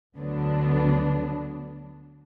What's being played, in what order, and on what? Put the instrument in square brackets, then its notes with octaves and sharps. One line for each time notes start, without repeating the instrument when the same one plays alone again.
[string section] D2 D3 F#3 B3 D4